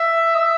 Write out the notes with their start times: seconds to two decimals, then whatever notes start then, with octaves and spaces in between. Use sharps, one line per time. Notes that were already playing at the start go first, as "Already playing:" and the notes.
Already playing: E5
0.35 D#5
0.39 E5